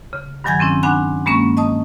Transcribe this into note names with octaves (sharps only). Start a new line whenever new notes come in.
C#3
G2 D#3 F#3 G#5 G6 G#6
F#3 C4 C#4 E4
D4 F#5 G#5 B5 F#6
G2 G#3 A#3 C#4 C#6
D#5 A5 D#6